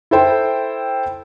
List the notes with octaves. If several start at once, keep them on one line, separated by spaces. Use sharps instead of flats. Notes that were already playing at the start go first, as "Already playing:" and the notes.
E4 A4 C5 G5